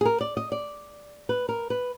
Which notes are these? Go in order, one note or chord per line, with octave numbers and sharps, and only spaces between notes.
G#4
A#4
D5
D#5
D5
B4
A#4
B4